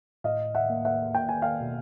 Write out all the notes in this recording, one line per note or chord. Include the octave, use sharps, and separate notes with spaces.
A2 D#5 F5
E5 F#5
A#3
E5 F#5
A#3 G5
G#5
F5 G5
B2